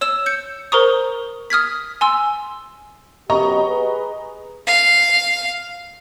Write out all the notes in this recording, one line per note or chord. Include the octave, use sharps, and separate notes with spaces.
C#5 E6 E7
G6 C#7
A#4 C5 A#5 C#6 D#6
D#6 F6 G#6 B6
G#5 C6 E6
F#2 B3 G4 D#5 A#5 C#6
G#4 B4
F5